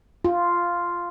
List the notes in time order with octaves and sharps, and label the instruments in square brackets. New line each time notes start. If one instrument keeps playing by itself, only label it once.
[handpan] F4